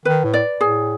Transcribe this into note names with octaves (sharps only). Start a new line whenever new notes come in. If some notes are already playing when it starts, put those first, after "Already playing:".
D#3 B4
A2
D5
A2 G#4